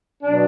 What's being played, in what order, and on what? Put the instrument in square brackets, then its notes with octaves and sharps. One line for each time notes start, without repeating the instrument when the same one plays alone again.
[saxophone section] B2 F#3 D4